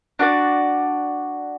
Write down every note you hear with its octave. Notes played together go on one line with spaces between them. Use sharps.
D4 F#4 B4 D5